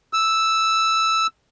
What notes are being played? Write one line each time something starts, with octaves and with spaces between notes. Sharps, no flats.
E6